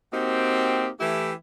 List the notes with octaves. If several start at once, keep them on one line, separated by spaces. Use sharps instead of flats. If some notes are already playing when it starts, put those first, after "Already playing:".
A#3 C4 D#4 F#4 G4
E3 A3 E4 G4